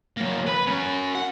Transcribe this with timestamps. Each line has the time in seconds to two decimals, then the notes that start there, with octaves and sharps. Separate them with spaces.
0.17 F#3 A#3
0.47 B4 B5
0.67 C#4 F#4
1.15 F#5